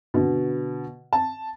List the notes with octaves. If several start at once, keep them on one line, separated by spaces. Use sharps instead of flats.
B2 D3
A5